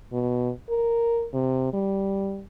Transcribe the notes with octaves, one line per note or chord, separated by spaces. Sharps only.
B2
A#4
C3
G3